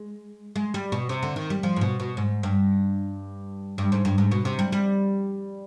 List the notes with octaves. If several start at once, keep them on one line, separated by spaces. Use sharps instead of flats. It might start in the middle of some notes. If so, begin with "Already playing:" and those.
Already playing: G#3
G#3
G3
B2
C3
D3
D#3
G3
F3
G#2
B2
B2
G#2
G2
G2
G#2
G2
G#2
B2
C3
G3
G3